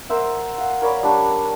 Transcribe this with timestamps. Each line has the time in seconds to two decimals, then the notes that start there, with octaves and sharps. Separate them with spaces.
0.09 A#4 C5 E5 F#5
0.58 F5 F#5
0.82 A#4 C#5 D5 B5
1.03 G3 D4 C#5 F#5